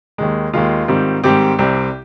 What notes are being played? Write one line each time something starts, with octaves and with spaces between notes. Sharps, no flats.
D#2 D#3 G#3
D#2 D#3 G#3 F4
G#2 D#3 G3 C4
G#2 D#3 G3 C4 G4
C2 C3 G3 C4